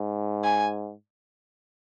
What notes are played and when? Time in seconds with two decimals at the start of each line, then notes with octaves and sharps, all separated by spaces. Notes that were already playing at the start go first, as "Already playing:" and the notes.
Already playing: G#2
0.44 G#5